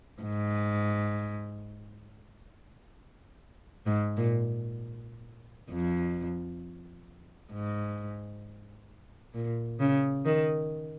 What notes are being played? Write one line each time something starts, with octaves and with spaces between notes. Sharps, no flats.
G#2
G#2
A#2
F2
G#2
A#2
C#3
D#3